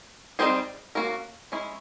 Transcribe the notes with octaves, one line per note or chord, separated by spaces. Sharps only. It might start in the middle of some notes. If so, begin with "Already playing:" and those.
G3 C4 D#4 G#4 C5
A#3 C#4 F#4 A#4
G#3 C#4 E4